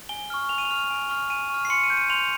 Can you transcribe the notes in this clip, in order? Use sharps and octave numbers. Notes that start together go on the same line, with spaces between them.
G#5 G7
C#6 F6
G#5 F7
D#7
F7
C#6 F6
G#5
C#6 F6
G#5 D#7
C#6 F6
C7
C6 C#7
D#7
G6
D#7
C6 F7